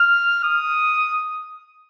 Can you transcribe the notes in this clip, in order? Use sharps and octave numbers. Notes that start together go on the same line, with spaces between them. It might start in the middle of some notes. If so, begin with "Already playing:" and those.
Already playing: F6
D#6